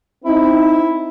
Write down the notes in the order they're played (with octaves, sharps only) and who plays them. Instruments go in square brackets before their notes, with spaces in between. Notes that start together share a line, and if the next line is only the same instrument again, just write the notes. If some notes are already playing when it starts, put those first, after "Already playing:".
[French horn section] C4 D#4 [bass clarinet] E4